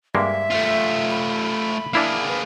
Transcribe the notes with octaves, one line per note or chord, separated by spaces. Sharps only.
G2 G#3 A#3 E5
A3 F4
B5
A#3 D4 E4 G#4 F5
B4